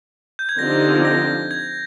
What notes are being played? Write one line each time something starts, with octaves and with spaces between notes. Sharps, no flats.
G6
G#6
D3 F3 C4 D#4 G4 A#6
A#6
G#6